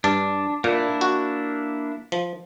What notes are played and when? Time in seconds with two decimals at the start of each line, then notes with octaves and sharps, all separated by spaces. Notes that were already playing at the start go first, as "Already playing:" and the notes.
0.04 G2 D4 A5
0.64 A#2 A#3 D4 E4
1.01 F#4
2.12 F3